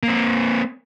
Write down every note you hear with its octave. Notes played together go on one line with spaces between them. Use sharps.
A#3 C4